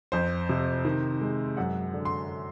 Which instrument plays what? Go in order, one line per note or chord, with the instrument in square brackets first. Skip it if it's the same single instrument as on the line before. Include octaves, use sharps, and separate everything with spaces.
[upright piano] F2 C5
C3
D#3
G#3
F#2 F#5
D3
C6